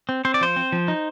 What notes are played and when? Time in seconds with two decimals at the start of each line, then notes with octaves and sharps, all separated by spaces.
0.09 C4
0.25 C4 C5
0.34 D5
0.41 F3 C5
0.56 C4
0.72 F3
0.88 D#4